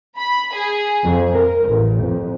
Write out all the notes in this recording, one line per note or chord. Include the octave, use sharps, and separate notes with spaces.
B5
G#4
F2
A#4
A1
F2